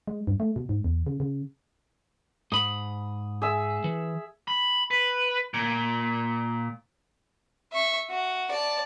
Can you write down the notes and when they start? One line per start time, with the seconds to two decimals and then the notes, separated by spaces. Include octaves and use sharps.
0.08 G#3
0.27 G2
0.40 A3
0.56 B2
0.69 G#2
0.84 E2
1.07 C#3
1.20 C#3
2.52 G#2 B5 D#6
3.42 G#4 E5 E6
3.84 E3
4.48 B5
4.91 B4
5.54 A#2
7.73 E5 C#6
8.10 F#4
8.51 D5 A5